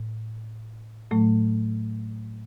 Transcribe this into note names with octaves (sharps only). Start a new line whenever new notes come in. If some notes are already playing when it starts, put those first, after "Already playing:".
Already playing: A2
A2 F#3 A3